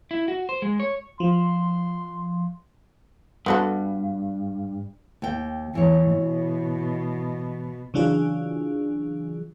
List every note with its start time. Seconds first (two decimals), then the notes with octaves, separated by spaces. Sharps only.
0.11 E4
0.28 F#4
0.49 C5
0.62 G#3
0.80 C#5
1.20 F3 C6
3.46 G2 B3 F#4 A4
5.22 D#2 G5
5.75 E2 E3 C#5
6.15 B2
7.94 C#3 E3 F#3 D4 F4 G#4